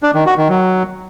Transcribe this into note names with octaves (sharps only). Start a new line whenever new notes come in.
D4
D#3
F#4
D#3
F#3